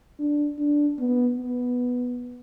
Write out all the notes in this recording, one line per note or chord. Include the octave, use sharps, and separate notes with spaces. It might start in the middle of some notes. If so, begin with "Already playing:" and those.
D4
D4
B3
B3